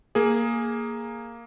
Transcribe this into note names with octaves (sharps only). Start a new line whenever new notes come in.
A#3 G#4